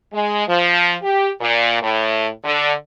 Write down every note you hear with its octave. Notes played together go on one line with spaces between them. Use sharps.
G#3
F3
G4
A#2
A2
D3